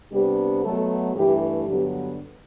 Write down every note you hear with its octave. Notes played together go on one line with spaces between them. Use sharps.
C3 G3 B3 D4 G4
B2 F#3 A3 A4
G2 E3 A3 G4
G2 D3 F#3 B3 G4